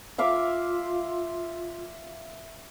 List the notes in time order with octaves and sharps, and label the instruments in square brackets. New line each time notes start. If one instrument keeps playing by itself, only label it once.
[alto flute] F4 [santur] E5 F5 D6